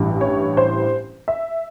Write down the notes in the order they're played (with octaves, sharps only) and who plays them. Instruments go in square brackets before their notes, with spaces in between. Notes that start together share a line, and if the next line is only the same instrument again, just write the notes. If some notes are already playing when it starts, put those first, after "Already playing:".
Already playing: [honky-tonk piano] A1 G2 E3
C#5
C5
E5